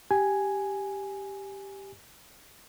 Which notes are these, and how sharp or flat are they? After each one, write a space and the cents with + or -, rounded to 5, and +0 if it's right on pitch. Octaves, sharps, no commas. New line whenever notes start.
G4 +0 G#5 +0